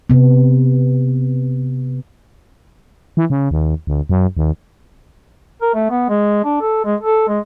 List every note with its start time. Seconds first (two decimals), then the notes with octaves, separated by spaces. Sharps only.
0.10 C3 B3
3.17 E3
3.30 C#3
3.51 D#2
3.87 D2
4.09 F#2
4.37 D#2
5.62 A#4
5.74 A3
5.90 B3
6.09 G#3
6.44 D4
6.61 A4
6.85 G#3
7.01 A4
7.28 G#3